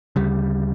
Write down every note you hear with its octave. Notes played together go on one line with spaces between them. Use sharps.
D2 C#3 G3